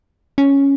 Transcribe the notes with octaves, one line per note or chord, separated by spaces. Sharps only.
C#4